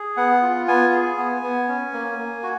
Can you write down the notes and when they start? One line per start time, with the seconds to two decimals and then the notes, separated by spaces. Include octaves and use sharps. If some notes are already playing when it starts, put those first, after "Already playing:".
Already playing: G#4
0.17 B3 F#5
0.42 F4
0.68 B3 G#5
0.93 G#4
1.18 B3
1.42 B3
1.68 C#4
1.93 A#3
2.18 A#3
2.43 F#4